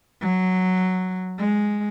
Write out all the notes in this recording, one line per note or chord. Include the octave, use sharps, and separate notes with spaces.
F#3
G#3